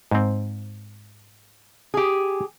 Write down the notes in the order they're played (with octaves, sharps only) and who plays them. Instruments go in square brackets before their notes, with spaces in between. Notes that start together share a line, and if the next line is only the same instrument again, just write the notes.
[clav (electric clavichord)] G#2 C4
[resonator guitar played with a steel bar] G4 G#4